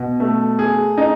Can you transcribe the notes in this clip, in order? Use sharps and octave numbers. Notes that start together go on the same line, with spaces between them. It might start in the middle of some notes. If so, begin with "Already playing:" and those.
Already playing: B2
A3
G#4
D#4